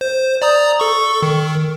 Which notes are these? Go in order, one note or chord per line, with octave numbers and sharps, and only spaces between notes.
C5
D5 A#5 D#6
A4 C#6
D#3